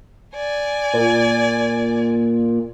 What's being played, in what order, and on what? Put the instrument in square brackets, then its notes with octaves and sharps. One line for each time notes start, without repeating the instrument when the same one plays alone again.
[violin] D5 G#5
[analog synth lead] A#2